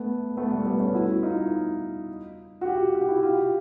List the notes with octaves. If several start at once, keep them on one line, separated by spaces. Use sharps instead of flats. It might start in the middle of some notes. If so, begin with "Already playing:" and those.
Already playing: A3 B3
A3 B3
G3 A3
A3 B3
B3 C#4
E4 F#4
D#4 F4
F#4
F4 G4
F#4
G4
E4 F#4
F4 G4